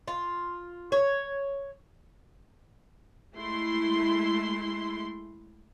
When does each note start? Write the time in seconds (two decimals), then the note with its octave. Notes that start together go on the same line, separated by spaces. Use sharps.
0.08 F4
0.92 C#5
3.35 G#3 A3 E4 C6